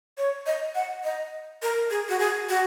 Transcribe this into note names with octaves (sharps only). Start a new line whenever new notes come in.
C#5
D#5
F#5
D#5
A#4
G#4
F#4
G#4
F#4